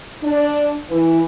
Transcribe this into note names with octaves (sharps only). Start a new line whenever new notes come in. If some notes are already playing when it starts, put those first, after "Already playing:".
D4
E3